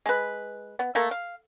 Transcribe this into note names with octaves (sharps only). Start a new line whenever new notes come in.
G#3 B4
B3
A3 A#3 A4
F5